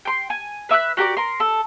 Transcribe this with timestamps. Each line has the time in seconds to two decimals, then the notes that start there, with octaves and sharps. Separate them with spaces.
0.05 G5 C6
0.30 G#5
0.69 B4 E5 D6 F#6
0.97 F#4 G4 A#4 D5
1.17 A#4 C6
1.40 A4